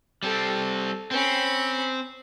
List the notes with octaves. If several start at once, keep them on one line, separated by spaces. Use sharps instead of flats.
G3 C4 A4
C4 C#4 B5